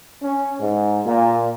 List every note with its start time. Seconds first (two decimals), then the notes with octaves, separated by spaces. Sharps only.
0.22 C#4
0.60 G#2
1.06 A#2